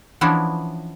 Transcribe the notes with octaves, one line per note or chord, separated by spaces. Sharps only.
E3 F3 B3 C#4 D4 E4